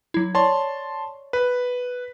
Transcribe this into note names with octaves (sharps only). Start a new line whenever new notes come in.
F#3 E4
C#5 D5 A5 C6 C#6
B4